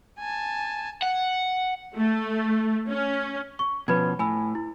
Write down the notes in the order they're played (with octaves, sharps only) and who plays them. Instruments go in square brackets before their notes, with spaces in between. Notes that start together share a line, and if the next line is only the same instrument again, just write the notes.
[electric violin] G#5 A5
[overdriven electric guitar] F#5
[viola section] A3
C#4
[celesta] C#6
[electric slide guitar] B2 F3 C#4 [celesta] B4 B5 G#6
[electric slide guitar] A2 [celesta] G#5 B5 E6
[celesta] E4